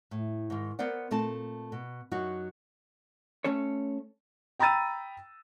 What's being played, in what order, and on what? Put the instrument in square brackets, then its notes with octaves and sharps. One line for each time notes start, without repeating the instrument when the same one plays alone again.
[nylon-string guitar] A2
G#2 D#3
B3 A#4 C5 D5 F#5
A#2 A3 C4 A5
B2
F#2 F#3 D#4 F#4
[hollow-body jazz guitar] A3 C#4 A4 C#5
[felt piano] G5 A#5 B5 E6 A6 D#7